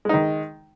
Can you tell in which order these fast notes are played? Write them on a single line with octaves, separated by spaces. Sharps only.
G#3 D#4 D#3